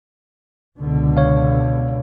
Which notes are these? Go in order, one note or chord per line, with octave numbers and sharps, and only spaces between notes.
C#2 B2 D3
C#5 F5